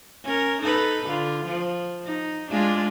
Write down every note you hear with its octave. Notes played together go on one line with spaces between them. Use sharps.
C#4 A#4
D#4 A4 B4
D3 F4
F3
D#4
G#3 D4 F4